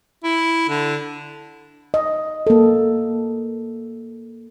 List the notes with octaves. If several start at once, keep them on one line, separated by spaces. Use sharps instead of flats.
E4
D3
D#5
A#3 A4